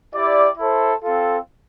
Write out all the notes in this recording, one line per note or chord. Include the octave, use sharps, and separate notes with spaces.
E4 G4 D5
E4 A4 C5
C4 F4 A4